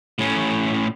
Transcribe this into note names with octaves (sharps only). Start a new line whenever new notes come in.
A2 C#4